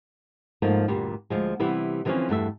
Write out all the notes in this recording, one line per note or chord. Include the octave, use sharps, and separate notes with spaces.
G#2 F3 A3 A#3
D2 G2 A#2 G3
D2 F3 G#3
C3 E3 G3 B3 E4
D3 E3 F3 A3 C4 C#4
E2 G2 A3 E5